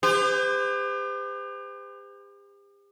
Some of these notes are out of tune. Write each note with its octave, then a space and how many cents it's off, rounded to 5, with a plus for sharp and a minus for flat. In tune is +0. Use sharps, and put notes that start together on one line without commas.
G4 +40 C5 -40